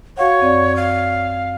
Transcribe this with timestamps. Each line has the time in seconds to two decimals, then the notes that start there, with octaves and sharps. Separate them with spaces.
0.17 F#4 C#5 F5 F#5
0.40 F#2 C4 D5
0.76 F5